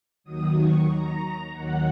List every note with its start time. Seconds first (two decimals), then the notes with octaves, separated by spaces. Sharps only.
0.24 D#2 D#3 F#3 D#6
0.57 C#6
0.89 A#5
1.53 D#2 D#3 F#3 F#5